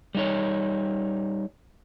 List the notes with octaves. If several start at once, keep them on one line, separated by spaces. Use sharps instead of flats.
G3 D#4 C#5